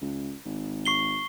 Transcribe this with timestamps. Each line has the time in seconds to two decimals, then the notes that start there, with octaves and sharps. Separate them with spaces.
0.02 C#2
0.45 G#1
0.85 C#6 C7 G7